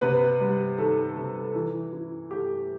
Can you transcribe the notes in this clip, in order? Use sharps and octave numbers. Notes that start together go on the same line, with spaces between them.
C3 B3 B4
G3
D#3 A4
C3
E3
E4
A3 G4